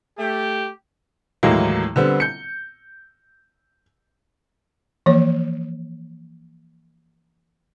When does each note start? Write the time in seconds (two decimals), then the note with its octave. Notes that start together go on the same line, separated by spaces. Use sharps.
0.19 A3 G4
1.43 D#2 A2 E3 F#3 G#3 A#3
1.96 D3 G3 B3 C4
2.20 G6 C#7
5.06 E3 F3 A#3 C#5